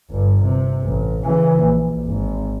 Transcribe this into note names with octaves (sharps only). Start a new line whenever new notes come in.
G1 G2
C3
A1
C#3 E3
A#1
G#1